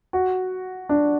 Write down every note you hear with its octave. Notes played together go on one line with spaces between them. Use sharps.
F#4
D4